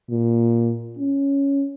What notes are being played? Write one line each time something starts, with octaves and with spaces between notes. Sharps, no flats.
A#2
C#4